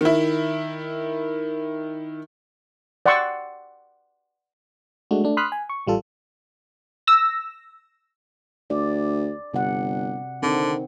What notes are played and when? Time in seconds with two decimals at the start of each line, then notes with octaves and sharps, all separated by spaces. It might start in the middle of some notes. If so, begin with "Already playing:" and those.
0.01 D#3 E4
3.06 D5 F#5 G5 C6 C#6 E6
5.11 G#3 A3 D4 F#4
5.24 A3 D4
5.37 B5 C6 D#6 F6 F#6 B6
5.52 G#5
5.69 C#6
5.87 A1 G3 F4 A4
7.07 E6 A#6
8.70 D2 D5
9.53 G1 C3 F#5
10.43 D3 D#3 C4